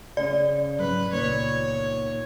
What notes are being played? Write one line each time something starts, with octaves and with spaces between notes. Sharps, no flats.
C#3 C#4 D5
G#1 F#3 B4
C#2 A#2 D#3 B3 C#5